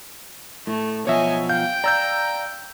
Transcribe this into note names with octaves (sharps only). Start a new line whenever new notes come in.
A2 A3
B2 F3 F#3 C#5 D#5 E5 G#5
F5 G5 G6
D5 F5 A#5 E6 G6